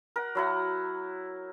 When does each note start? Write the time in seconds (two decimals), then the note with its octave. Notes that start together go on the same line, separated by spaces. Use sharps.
0.16 A#4 F#5
0.35 F#3 E4 F#5